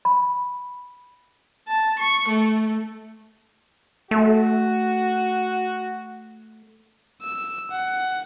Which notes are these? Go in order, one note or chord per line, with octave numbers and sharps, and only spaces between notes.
B5
A5
C#6
A3
A3 F#4
E6
F#5